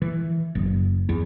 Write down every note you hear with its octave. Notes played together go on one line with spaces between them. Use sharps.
E3
F#1
E2